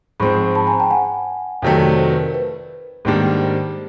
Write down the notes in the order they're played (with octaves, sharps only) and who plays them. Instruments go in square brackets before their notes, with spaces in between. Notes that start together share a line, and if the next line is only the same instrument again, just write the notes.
[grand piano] G#2 F3 G#3 C4 [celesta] B5 C#6
[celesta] A5 B5
G#5 A#5
G5 A5
F#5 G#5
[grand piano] F2 C3 D#3 F#3 A3 [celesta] F5 G5
[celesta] C5 D5
C5 D5
C5
B4
A#4
B4
[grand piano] G#2 D#3 G3 A#3 D4
[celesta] C5